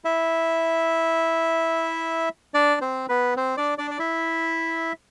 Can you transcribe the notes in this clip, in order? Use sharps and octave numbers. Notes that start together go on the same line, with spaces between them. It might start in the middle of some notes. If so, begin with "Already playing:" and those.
E4 E5
D4 D5
C4 C5
B3 B4
C4 C5
D4 D5
D4 D5
D5
E4 E5